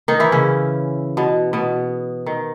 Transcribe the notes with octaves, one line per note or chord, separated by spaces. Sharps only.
D#3 D#4
E3 E4
C#3 C#4
B2 B3
B2 B3
D#3